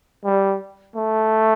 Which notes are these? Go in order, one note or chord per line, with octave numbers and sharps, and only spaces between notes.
G3
A3